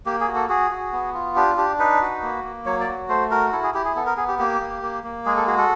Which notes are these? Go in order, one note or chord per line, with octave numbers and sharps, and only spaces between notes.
A#3 G4
G#4
F#4
A4
F#4 G#4
F#4
B3
F4
D4 G4
D4 G4
D#4 B4
F#4
A#3
A#3
F#3 C#5
D5
F#4
A3 C5
F#4 A#4
E4 A4
G#4
E4 G4
G#4
B3 A4
A#4
B3 G#4
G4
A#3 G4
A#3
A#3
A#3
G#3 G#4
A4
F#4 G#4
A4